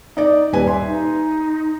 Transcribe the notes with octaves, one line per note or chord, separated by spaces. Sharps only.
D#4 D5
D#1 B4 G#5
E5 C6
D#4